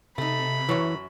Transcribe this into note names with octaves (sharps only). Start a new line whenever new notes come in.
C3 A3 D#4 B5
F#2 E3 F#3 C#5